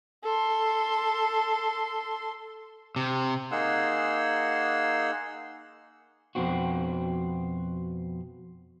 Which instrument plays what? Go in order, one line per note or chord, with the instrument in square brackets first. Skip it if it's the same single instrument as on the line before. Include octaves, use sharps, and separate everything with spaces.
[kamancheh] A4 C6
[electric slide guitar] C3
[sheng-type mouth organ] A#3 D#4 G#4 F#5 C6 E6
[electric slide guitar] F2 B2 C4 F#4